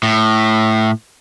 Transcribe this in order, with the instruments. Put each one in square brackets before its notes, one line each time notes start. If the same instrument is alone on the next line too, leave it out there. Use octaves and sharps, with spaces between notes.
[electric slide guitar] A2